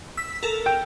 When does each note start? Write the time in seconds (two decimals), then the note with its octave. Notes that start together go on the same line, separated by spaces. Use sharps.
0.17 E6 B6
0.43 A4 A#4
0.66 G5